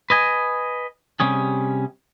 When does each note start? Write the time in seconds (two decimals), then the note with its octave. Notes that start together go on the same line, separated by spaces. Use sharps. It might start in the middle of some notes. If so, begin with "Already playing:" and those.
0.10 B4 D#5 G#5
1.20 C3 G3 C#4 G#4